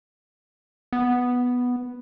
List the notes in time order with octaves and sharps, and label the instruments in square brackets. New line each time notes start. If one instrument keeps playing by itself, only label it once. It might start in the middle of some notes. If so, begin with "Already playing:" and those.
[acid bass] B3